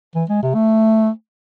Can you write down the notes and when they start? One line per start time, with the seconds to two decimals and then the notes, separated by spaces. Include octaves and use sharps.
0.15 E3
0.29 G#3
0.42 C3
0.54 A3